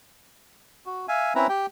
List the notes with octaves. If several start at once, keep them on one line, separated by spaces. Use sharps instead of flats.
F#4
E5 F5 G#5
C4 C#4 E4 B4 E5 A#5
G4 G5